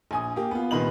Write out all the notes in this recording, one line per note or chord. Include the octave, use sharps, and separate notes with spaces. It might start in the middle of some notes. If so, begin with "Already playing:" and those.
A#1 G#5 D#6
A#3 G4
B3 F4
C2 A#2 D#3 B4 D#5 F#7